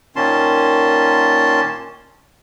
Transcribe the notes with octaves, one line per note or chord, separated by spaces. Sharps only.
A#2 D#3 A#3 C#4 A5 C6